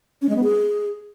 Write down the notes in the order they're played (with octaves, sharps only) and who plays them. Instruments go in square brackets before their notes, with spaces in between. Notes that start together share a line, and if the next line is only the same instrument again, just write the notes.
[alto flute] C#4
G#3
B3
G#4